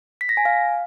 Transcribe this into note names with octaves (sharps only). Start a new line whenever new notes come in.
B6
A#6
G#5
F5